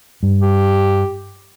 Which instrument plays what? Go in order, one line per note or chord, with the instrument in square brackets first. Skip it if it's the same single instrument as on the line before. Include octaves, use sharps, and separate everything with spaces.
[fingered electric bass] G2
[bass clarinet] G4